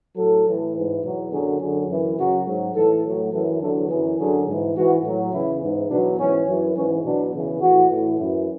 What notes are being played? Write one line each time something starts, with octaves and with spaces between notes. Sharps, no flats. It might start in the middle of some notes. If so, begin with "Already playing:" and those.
A2 F#3 A4
A2 E3
G#2 E3
E2 B2 F#3
F#2 D3 F#3 G#4
F#2 D3 F#3 G#4
F#2 E3
F#2 C#3 F#3 F#4
G#2 F#3
A2 E3 A4
A2 F#3
F#2 E3 A4
E2 D3 F#3 A4
F#2 E3 G#4
F#2 D3 F#3 G#4
G#2 E3
G#2 E3 F#4
A2 F#3
E2 C#3 E3 E4
G#2 E3
E2 B2 F#3 D4
G#2 E3 C#4
F#2 E3
G#2 E3 C#4
E2 B2 F#3 D4
E2 C#3 E3
A2 E3 F#4
A2 E3
F#2 E3